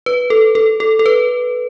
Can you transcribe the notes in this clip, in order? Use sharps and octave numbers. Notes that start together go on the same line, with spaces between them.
B4
A4
A4
A4
A4
B4